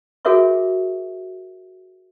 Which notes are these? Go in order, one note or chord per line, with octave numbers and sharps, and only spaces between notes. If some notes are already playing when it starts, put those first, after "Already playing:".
F#4 G#4 A#4 C#5 E5 C#6